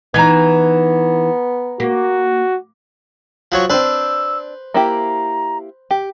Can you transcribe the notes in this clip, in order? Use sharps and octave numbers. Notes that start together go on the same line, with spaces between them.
E3 B3 D#4 A#5 G#6
A#3 F#4
F3 F#3 C#5
C4 D4 B4 C5 E6
A#3 E4 G4 A#5
G4